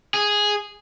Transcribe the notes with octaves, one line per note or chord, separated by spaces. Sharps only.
G#4